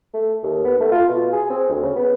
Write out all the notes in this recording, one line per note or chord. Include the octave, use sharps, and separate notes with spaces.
A3
D#2
B3
A3
F4
B2
G#4
C4
D2
C#3
B3